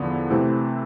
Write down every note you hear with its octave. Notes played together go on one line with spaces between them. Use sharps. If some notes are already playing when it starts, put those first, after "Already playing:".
Already playing: E2 D3 F3 B3
C3 E3 A3 C4